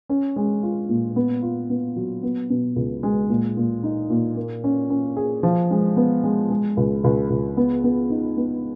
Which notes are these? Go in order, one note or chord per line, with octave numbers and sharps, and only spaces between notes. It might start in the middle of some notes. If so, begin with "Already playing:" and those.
C#4
G#3
F4
A#2
B3
F4
B3
F#3
B3
B2
C#2
G#3
A#2
A#2
D#4
A#2
A#3
C#4
C#4
G#4
F3
G#3
B3
G#3
G#3
C#2
C#2
C#2
B3
B3
D#4
B3